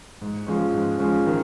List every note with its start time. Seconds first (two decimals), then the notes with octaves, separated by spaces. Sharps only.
0.21 G#2
0.47 F3 G#3 C#4
0.74 G#2
1.00 F3 G#3 C#4
1.26 D#3